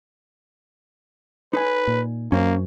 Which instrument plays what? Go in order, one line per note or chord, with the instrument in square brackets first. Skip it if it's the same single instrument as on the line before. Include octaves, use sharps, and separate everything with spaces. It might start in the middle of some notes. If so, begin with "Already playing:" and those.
[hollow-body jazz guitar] D#4 G#5 [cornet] B4
[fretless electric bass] A#2
[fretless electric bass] F#2 [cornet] A#3 [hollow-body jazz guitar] C#4 C5